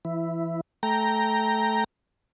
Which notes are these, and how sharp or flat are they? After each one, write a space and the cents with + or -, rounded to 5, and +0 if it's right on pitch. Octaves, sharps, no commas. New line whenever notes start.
E3 +25 E4 +0
A3 -15 G5 +0 A#5 +0